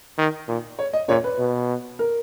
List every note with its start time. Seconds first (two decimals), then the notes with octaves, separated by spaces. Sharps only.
0.18 D#3
0.48 A#2
0.79 C#5
0.93 D#5
1.08 A#2 C#5
1.24 B4
1.39 B2
1.99 A#4